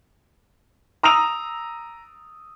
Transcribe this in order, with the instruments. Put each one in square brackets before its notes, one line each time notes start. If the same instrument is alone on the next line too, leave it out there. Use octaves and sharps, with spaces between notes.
[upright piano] A#5 D#6 E6 F7